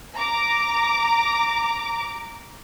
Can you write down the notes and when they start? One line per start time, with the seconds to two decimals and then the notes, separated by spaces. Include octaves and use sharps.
0.16 A#5 D6